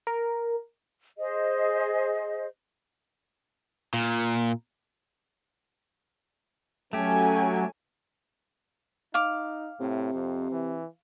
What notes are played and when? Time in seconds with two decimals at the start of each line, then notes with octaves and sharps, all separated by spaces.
0.07 A#4
1.18 G#4 C5 D#5
3.94 A#2
6.93 F#3 A3 C#4 G4 A4 G#5
9.14 D#4 F5 D6
9.80 A2 C3
10.14 F2
10.51 E3